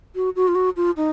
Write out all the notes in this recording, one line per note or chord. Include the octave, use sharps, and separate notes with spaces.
F#4
F#4
F4
F#4
F4
D#4